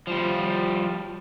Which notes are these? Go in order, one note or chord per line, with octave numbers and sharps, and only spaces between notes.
F3 G3